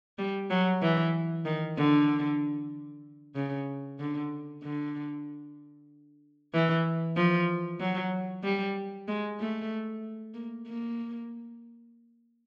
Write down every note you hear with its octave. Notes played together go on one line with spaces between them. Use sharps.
G3
F#3
E3
D#3
D3
C#3
D3
D3
E3
F3
F#3
G3
G#3
A3
A#3
A#3